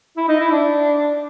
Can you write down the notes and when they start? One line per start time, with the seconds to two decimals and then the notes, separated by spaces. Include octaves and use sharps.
0.17 E4
0.28 D#4
0.40 E4
0.51 D4